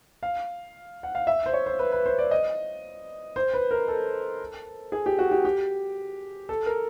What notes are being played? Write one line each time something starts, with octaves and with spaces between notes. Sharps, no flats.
F5
F#5
F5
E5
C5
C#5
C5
B4
B4
C5
D5
D#5
C5
B4
A#4
A4
G#4
G4
F#4
G4
G4
A4
A#4